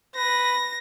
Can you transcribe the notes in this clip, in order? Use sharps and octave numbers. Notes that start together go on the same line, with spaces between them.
B4 A#6